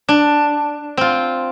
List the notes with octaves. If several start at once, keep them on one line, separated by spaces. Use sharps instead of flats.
D4
C4 F4